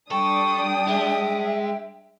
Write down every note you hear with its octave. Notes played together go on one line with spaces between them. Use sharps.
G3 D4 A4 G5 C#6 D#6
G#3 E5